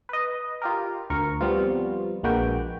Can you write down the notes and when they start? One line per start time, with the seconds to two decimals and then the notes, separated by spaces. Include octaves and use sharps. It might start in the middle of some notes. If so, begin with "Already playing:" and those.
0.09 B4 D#5
0.62 F4 G4 A#4
1.10 D2 A#4 C#6
1.41 F3 G3 B3 C4 F4
2.23 A#1 G#3 A#3 F#4 B4 G5